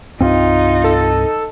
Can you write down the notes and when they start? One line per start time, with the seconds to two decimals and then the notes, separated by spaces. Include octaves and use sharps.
0.21 C2 G2 C4 D#4 F4
0.84 A4